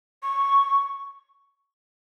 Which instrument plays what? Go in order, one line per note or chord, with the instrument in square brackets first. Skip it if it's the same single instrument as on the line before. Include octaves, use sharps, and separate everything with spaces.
[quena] C#6